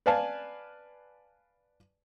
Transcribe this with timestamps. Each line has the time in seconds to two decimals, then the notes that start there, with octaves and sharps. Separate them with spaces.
0.06 B4 D5 F5 G#5 A5